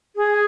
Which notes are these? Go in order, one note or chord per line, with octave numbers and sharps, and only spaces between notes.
G#4